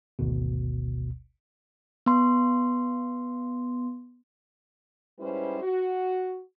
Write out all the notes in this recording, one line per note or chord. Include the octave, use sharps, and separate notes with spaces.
G#1 D2 B2
B3 C6
G#2 G3 C#4 E4 B4 C5
F#4